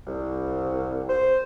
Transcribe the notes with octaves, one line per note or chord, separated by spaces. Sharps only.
C2
C5